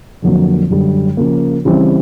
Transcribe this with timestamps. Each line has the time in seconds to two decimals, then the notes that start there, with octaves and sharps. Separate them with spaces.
0.22 F2 D3 F#3 A#3
0.70 F#2 D3 G3
1.17 C#3 F3 A#3
1.65 C#3 E3 G3 C4